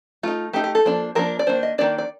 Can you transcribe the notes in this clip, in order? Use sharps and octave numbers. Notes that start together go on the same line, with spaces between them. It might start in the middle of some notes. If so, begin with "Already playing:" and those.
A3 D#4 F4
A3 D#4 G4
G4
A4
F3 A#3 D4
F3 A#3 D4 A#4
D5
D#3 A#3 D4 C5
D#5
D#3 A#3 D4 D5
D5